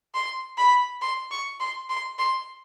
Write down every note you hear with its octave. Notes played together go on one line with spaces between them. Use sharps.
C6
B5
C6
C#6
C6
C6
C6